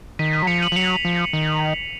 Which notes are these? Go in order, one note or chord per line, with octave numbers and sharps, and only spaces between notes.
D#3 B6 D#7
B6 D#7
F#3
F3 C#7 F7
D#7 F#7
F3
F#3 C#7 F7
F3
D#3